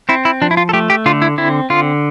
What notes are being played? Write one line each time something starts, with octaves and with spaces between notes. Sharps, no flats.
C4 E4
E4
F3 D4
E4
F4
A4
A3 G4
G4
D3 F4
E4
C4 E4
D3 F4